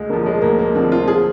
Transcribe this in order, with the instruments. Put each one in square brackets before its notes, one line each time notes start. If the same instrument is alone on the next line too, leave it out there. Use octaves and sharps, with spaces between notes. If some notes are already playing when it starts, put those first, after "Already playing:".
Already playing: [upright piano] D2 G#3
D3 A#3
F3
G#3
D2 A#3
A#3
D3 F3 C4
F4
G#4